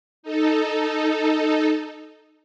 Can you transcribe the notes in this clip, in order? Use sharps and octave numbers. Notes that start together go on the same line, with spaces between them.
D#4 A4